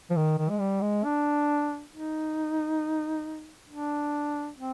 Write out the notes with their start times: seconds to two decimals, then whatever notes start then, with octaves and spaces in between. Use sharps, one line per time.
0.10 F3
0.16 D#3
0.38 D#3
0.49 G#3
0.60 G3
0.81 G#3
1.04 D4
1.92 D#4
3.69 D4
4.58 C4